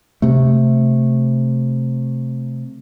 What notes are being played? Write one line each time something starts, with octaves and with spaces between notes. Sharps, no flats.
C3 A3